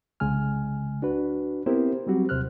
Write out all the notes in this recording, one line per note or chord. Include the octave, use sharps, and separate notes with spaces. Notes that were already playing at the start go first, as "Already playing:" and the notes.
C2 C#3 G#3 G#5 F6
D4 F#4 B4
B3 C4 E4 G4 A#4 C5
F#3 G3 C4 F#4 G4
D#2 C3 C5 F6 F#6